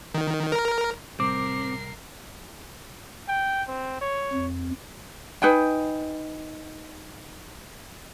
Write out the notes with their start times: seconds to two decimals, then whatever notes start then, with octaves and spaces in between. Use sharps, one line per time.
0.14 D#3
0.52 A#4
1.20 A2 C3 G3 C4 A#4 D6 C7
3.29 G5
3.68 C4
4.01 C#5
4.32 F2
5.42 D#4 B4 G5 G#5